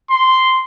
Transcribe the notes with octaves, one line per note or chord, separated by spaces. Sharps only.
C6